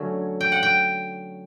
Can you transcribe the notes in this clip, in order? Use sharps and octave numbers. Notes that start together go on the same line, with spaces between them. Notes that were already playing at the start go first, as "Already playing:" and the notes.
Already playing: D3 F#3 A3 C#4
G5
F#5
G5